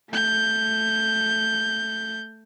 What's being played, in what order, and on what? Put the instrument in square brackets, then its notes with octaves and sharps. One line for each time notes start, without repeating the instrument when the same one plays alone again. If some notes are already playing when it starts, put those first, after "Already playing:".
[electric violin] A3 G6